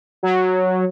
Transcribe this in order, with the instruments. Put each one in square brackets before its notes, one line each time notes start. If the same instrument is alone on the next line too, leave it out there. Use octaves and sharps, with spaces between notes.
[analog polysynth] F#3